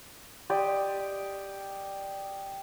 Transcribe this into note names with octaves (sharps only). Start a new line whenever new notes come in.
G4 D5 D#5